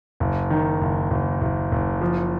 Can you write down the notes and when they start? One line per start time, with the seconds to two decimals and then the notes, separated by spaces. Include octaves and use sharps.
0.20 F#1
0.50 D#3
0.81 F#1
1.10 F#1
1.41 F#1
1.72 F#1
2.01 F3